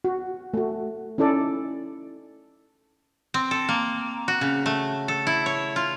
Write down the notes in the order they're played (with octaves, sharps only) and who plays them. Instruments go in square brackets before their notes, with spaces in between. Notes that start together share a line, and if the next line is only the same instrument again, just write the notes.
[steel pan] F#4
A3 F#4
C#4 D#4 E4 A4 D5
[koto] C4
A4
A#3
F#4
C#3
A3
A4
E4
C#5
F4